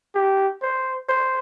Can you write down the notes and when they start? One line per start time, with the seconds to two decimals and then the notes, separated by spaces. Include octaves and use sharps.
0.15 G4
0.62 C5
1.09 C5